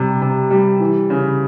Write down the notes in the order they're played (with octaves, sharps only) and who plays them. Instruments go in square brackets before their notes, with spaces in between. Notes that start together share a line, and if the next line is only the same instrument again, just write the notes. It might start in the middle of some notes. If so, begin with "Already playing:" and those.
Already playing: [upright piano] C3 G3
C3
G3
E3
C#3